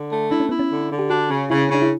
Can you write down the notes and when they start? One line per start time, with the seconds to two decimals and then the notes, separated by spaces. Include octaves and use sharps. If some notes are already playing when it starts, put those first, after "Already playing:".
Already playing: D3
0.11 A3
0.31 D4 E4
0.40 C#4
0.49 B3 E4
0.59 C#4
0.71 D3
0.90 D3
0.99 G4
1.10 D4 F#4
1.30 C#3
1.50 C#3 E4
1.70 C#3 D4
1.82 E4